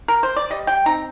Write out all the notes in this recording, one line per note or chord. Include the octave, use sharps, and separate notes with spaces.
A#4
C5
D5
G3 D#5
G5
C4 D#4 A#5